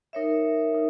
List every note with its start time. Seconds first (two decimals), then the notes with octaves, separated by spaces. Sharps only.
0.13 D#4 A#4 C#5 E5
0.74 D#4